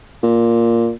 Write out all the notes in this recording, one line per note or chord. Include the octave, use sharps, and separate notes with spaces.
A#2